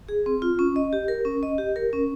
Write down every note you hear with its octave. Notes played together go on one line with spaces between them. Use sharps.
G#4
C4
F4
C#4
D#5
G4
A#4
C#4
D#5
G4
A#4
C#4